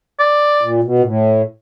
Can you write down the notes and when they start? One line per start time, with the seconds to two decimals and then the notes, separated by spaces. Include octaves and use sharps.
0.19 D5
0.62 A#2
0.84 B2
0.99 A#2
1.04 A2